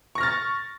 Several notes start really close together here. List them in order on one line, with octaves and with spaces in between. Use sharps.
C#6 A#6 F6 A6